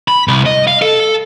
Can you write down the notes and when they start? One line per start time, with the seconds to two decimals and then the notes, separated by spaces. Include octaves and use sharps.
0.08 B5
0.28 C2
0.46 D#5
0.67 F5
0.82 A4